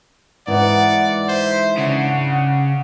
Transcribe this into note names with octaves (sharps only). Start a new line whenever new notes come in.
G#2 E3 D5 F#5
C5 E5
C#3 D4 F#5